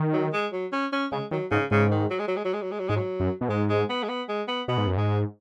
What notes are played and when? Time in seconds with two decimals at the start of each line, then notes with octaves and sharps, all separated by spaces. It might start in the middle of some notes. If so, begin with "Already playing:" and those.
Already playing: D#3
0.13 F#3
0.33 G#3
0.53 F#3
0.73 C#4
0.93 C#4
1.12 C#3 G#3
1.31 D#3 F#3
1.51 G#2 C#3
1.71 G#2 C#3
1.91 D#3
2.10 F#3
2.19 G#3
2.28 F#3
2.37 G#3
2.45 F#3
2.53 G#3
2.62 F#3
2.71 G#3
2.79 F#3
2.88 G#2 G#3
2.96 F#3
3.20 F#2
3.41 B2
3.49 G#2 G#3
3.69 G#3
3.89 B3
4.03 G#3
4.09 B3
4.29 G#3
4.48 B3
4.68 B2 B3
4.78 G#2
4.87 F#2
4.97 G#2 G#3